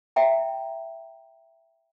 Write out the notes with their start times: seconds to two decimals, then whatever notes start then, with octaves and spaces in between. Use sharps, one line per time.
0.16 E5 G5 A#5